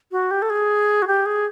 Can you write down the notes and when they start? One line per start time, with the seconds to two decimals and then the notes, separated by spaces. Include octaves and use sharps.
0.12 F#4
0.31 G4
0.42 A4
0.50 G#4
1.02 F#4
1.07 G4
1.26 G#4